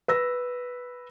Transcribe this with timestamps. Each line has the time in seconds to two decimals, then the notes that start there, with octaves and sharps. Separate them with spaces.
0.08 B4 E6 A#6